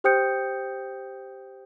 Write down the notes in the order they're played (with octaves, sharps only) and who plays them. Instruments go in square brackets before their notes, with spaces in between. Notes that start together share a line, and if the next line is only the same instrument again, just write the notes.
[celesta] G4 C5 G5 D#6 G6 C#7